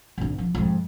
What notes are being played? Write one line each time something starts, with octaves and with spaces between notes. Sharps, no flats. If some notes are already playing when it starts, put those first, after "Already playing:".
G#1 D3
F3
F2 G#2